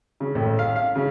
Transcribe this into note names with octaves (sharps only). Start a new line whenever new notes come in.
C#3
A1
F5
F5
C#3